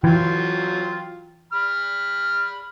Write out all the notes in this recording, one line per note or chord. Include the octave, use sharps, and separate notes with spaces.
E3 F#3 F4 G5
B5 F6